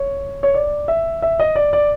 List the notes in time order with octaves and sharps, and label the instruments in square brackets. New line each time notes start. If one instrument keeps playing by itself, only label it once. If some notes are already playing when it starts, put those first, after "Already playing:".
Already playing: [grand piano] C#5
C#5
D5
E5
E5
D#5
D5
D5